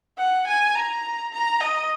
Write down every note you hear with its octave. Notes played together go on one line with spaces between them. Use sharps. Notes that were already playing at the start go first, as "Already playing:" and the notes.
F#5
G#5
A#5
A#5
D#5